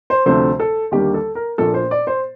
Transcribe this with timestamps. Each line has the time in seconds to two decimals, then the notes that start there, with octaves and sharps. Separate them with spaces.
0.10 C5
0.26 D2 C3 F3 A3 C5
0.60 A4
0.91 D#2 D3 G3 A#3 G4
1.14 A4
1.35 A#4
1.58 A#1 A#2 F3 A#3 A4
1.74 C5
1.91 D5
2.07 C5